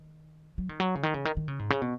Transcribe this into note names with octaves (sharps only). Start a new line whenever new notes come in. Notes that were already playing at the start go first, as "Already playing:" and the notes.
Already playing: D#3
F#3
D#3
F#3
C#3
D#3
C#3
D#3
D#3
C#3
G#2
C#3
B2